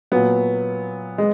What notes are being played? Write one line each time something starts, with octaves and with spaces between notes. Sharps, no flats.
A#2 F#3 B3
G#3